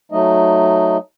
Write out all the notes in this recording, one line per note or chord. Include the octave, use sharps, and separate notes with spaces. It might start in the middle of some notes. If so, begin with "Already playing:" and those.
F#3 A3 D#4 D#5